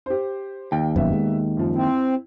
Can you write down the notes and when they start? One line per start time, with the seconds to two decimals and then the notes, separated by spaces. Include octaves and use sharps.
0.06 G4 C5
0.72 D#2 G5
0.96 F1 F#2 B3 E5
1.13 G#3
1.57 F#2 F3
1.75 C4 E4